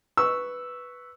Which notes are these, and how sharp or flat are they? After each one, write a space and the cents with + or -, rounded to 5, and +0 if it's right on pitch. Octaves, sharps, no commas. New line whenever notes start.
B4 +0 C#6 +0 E6 +0